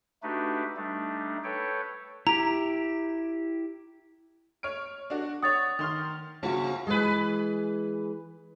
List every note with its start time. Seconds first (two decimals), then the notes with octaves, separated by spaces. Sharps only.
0.23 A3 D4 D#4 F#4 G4 B4
0.76 G3 A3 D4 D#4
1.44 A4 B4 C#5 G5
2.27 E4 G4 A#5
4.63 C#5 F6 D7
5.10 D4 F#4
5.42 C#5 F#5 D#6 A6
5.79 D#3 C6 F6
6.43 C#3 A#3 F4 F#4
6.87 E3 G#3 G#4 B4